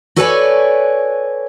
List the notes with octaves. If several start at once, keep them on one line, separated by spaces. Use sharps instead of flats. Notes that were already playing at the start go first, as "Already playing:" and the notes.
F#4 A4 B4 C#5 D5 G#5